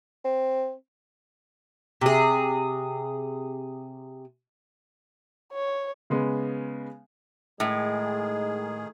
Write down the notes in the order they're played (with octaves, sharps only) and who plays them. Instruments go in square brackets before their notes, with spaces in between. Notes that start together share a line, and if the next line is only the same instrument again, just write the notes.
[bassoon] C4
[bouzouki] C3 G#4
[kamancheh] C#5
[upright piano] C#3 G#3 B3
[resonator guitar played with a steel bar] A2 [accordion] D#3 G#4 [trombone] G#3